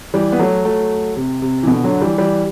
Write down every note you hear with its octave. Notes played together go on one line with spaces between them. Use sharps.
E3 G3
B3
F#3 A3
F#3 A3
C3
C3
E3
B2 D3
D3 F#3
E3 G3
E3 G3